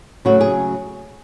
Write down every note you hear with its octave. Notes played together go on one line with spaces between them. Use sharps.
C#3 F#3 A3 F#4
G#4